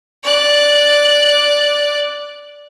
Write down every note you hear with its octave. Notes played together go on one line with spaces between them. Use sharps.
D5 F#6